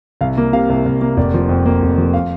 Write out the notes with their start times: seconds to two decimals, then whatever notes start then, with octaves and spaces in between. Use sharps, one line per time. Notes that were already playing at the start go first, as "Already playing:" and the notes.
0.21 C2 F5
0.37 A#3
0.53 C3 F5
0.70 C2
0.86 C2
1.01 A#3
1.17 F1 D5
1.34 F3
1.49 F2
1.66 A#3
1.82 F1
1.97 F3
2.14 F5